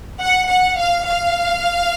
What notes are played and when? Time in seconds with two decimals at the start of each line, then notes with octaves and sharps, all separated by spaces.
0.20 F#5
0.48 F#5
0.77 F5
1.04 F5